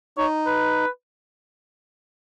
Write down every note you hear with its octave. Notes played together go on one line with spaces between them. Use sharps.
D#4 C#5
B4